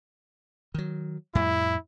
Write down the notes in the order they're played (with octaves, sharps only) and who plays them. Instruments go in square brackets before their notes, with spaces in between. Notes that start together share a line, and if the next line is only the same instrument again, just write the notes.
[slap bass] D#3 F#3
[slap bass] F2 A2 G3 [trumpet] E4